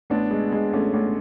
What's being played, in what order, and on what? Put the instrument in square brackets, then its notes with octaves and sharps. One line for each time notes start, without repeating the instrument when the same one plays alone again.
[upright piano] A1 [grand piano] B3 D4
[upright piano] G#3
G#3
[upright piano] A1 [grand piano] A3 C#4
[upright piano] A1